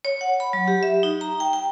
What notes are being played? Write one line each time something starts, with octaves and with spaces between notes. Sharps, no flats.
C#5
F#5
B5
F#3
G4
E5
D#4
A#5
G5
G5